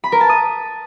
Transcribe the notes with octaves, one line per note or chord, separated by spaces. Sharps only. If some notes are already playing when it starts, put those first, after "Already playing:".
B5
A#4
A5
D#6